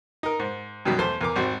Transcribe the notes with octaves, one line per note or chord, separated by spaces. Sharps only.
D#4 A#4
G#2
F#2 B2 D#3 F#3 G3
E2 A3 C5 C6
E2 A#4 D6
G#1 G3 C4 F#4